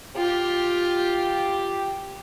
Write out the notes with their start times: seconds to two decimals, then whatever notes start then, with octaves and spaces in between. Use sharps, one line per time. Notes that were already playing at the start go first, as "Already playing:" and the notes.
0.16 F4 G4